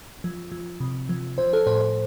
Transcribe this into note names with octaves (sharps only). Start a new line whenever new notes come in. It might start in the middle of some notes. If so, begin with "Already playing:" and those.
F3
F3
C3
F3
F3 C5
A4
A2 C5
C5